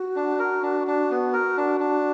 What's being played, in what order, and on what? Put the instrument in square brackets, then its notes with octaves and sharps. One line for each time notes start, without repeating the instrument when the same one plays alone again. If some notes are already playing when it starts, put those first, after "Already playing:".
Already playing: [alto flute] F#4
[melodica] D4
A#4
D4
D4
B3
A#4
D4
D4